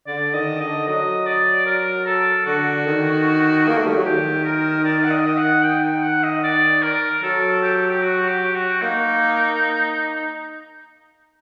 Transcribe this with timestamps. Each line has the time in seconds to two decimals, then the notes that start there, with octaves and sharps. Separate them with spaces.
0.07 D3 D5
0.34 D#3 D#5
0.60 D3 D#5
0.87 F#3 D#5
1.26 D5
1.66 A#4
2.06 A4
2.46 D3 F#4
2.86 D#3
3.68 A#3
3.77 A3
3.86 G3
3.96 F#3
4.05 D#3 G4
4.44 A#4
4.85 D5
5.04 F#5
5.11 D#5
5.26 D#5
5.38 F#5
5.64 G5
5.83 G5
6.03 F#5
6.23 D#5
6.44 D5
6.82 A#4
7.23 F#3 A4
7.62 G4
7.91 G4
8.03 F#4
8.29 G4
8.55 F#4
8.82 A#3 D#4